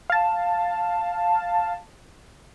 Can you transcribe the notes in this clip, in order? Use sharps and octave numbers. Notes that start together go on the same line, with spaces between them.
F5 A5